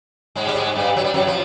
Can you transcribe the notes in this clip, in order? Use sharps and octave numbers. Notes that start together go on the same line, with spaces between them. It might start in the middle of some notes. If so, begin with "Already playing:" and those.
G#2 G#3
G3
G#2 G#3
G2 G3
F#3
G3
F#2 F#3
F3